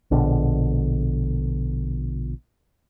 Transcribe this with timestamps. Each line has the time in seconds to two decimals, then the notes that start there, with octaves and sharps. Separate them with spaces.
0.11 A#1 B2 D3